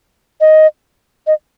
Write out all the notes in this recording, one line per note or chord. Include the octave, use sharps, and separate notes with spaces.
D#5
D#5